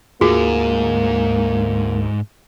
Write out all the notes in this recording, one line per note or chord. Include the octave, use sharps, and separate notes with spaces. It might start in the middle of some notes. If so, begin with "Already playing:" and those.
D2 G#2 A#3 F4 F#4 G#4